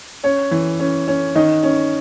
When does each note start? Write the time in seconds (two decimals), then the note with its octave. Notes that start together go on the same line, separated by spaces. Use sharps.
0.24 C#4 C#5
0.51 E3
0.79 C#4
1.08 C#4
1.35 D#3 D#5
1.63 C#4